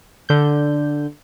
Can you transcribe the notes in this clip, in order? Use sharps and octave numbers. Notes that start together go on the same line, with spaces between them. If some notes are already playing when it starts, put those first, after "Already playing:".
D3 G6